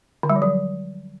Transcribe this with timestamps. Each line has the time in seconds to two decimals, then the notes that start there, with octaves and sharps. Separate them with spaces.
0.23 D3
0.30 G3
0.36 F3
0.42 F#3